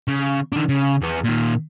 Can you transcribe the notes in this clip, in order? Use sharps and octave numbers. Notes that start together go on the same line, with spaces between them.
C#3
D#3 D4
C#3
E2 B3
A#2 D#3